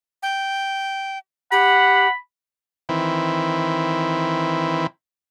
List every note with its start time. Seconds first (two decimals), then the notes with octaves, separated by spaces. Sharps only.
0.23 G5
1.52 G4 F#5 B5
2.89 D#3 E3 C4 E4